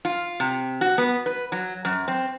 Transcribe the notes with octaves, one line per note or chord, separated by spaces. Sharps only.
F4
C3
F#4
B3
B4
F#3
F#2
C4